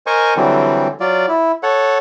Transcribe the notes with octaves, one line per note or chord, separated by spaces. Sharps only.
A#4 C5 D#5 G#5 C#6
D3 E3 F#3 G3 C4
F#3 F4 D5
E4
A4 C#5 F#5